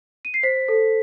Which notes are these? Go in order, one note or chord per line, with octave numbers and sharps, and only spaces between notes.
D#7
C7
C5 B6
A4